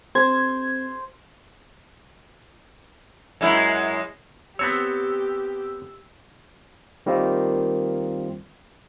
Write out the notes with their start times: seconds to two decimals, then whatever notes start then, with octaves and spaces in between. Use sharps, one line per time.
0.15 C4 C5 G#6
3.41 F#2 G#3 E4
4.59 B3 C4 G4 C#5 E6
7.06 D#3 G3 A#3 C4 F4